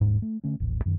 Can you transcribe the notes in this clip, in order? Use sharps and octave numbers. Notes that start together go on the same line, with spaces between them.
D#1 G#2
A3
D3 A3 C#4
D#1 A1
F#2 D#3